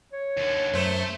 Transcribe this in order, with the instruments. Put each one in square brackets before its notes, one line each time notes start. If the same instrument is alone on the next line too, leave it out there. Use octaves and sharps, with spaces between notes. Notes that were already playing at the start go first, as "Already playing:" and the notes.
[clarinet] C#5
[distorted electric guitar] D#2 D3
[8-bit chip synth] F#2 C5 [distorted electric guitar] A3